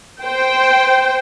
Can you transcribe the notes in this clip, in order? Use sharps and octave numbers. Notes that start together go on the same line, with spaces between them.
C5 G5